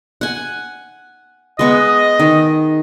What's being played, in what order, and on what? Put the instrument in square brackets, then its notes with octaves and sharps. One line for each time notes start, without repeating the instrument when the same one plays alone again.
[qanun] F#5 G#5
[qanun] G#3 B3 C#6 [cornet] D#5
[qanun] D#3